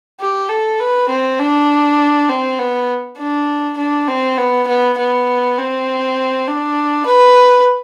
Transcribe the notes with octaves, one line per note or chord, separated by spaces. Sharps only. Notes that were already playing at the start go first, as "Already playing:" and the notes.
G4
A4
B4
C4
D4
C4
B3
D4
D4
C4
B3
B3
B3
C4
D4
B4